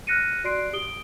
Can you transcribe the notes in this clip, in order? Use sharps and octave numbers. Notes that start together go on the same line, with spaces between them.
F6 F#6 A#6 C#7 D#7
F#4 D5 C6 F#6 C7 D7
G4 D#6 D7 G7